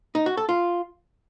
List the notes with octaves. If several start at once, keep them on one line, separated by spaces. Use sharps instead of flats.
D#4
F#4
A4
F4